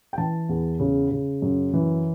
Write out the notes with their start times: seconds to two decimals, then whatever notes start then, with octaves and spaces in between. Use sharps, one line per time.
0.13 G5
0.18 E3 A5
0.49 E2
0.79 C#3
1.11 C#3
1.42 F#2
1.73 E3